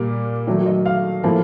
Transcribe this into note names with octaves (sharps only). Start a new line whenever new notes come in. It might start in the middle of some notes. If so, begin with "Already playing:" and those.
Already playing: A#2 G3 A#3
D#3 F#3 A3
D#5
F5
A2 F3 A#3